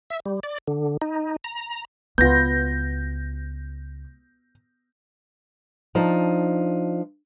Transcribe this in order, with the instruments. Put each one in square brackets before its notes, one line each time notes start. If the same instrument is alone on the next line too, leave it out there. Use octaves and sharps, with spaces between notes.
[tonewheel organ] E5
G3
D5
D3
D#4
A#5
[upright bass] C#2 [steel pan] B3 F4 [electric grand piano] G6 A#6
[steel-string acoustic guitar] F3 D4 D#4